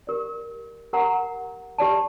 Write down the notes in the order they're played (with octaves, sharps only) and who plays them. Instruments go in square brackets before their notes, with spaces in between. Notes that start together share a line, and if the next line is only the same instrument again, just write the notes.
[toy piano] G4 A#4 D5
G4 A#4 F#5 A#5
G4 D5 A5